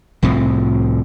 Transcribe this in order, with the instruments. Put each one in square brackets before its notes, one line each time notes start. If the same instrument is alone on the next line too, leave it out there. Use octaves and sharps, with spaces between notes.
[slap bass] C2 A2 F3 C4